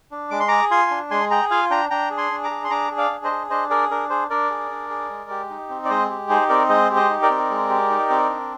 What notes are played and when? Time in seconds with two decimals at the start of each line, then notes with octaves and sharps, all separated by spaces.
0.12 D4
0.31 G#3 D6
0.40 C6
0.48 G#4 A#5 D6
0.71 F4 G#5 C6
0.91 D4
1.11 G#3 G#5 C6
1.31 G#4 G5 A#5
1.51 F4 F5 G#5
1.70 D4 G5 A#5
1.90 D4 G5 A#5
2.10 G#4
2.18 G#5 C6
2.32 D4
2.44 A#5 D6
2.51 G#4
2.64 C6
2.70 D4 A#5 D6
2.91 G#4
2.97 D5 F5
3.10 D4
3.24 C5 D#5
3.31 G#4
3.50 D4 C5 D#5
3.70 G#4 A#4 D5
3.91 D4 A#4
4.10 G#4 C5
4.30 D4 A#4 D5
4.50 G#4
4.71 D4
4.90 G#4
5.10 G#3
5.30 G4
5.50 D#4
5.69 C4
5.85 D5
5.89 G#3 C5 D#5
6.10 G4
6.29 D#4 G#4 C5
6.49 C4 A#4 D5
6.69 G#3 C5 D#5
6.90 G4
6.96 C5 D#5
7.10 D#4
7.22 A#4 D5
7.30 C4
7.50 G#3
7.70 G4
7.90 D#4
8.10 C4
8.30 D4